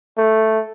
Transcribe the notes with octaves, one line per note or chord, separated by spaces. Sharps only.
A3